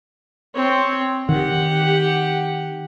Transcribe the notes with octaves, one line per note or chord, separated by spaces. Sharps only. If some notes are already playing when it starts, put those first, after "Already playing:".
C4 C#5
D#3 G4 F#5